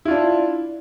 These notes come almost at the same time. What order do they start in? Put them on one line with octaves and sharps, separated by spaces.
E4 F4 D4